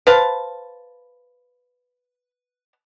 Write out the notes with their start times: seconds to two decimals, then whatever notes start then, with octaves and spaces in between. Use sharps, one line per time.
0.07 B4 C5 F5 A5